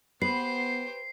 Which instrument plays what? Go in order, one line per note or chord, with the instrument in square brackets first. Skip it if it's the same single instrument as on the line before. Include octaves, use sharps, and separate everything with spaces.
[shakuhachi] B3 [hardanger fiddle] G4 C5 [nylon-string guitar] B4 [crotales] C7